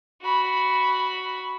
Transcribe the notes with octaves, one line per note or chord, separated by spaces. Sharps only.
F#4 B5